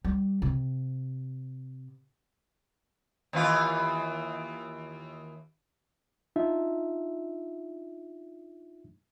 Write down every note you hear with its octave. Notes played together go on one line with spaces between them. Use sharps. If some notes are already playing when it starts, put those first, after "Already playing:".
G3
C3
D#2 E3 F4
D4 D#4 F4 E5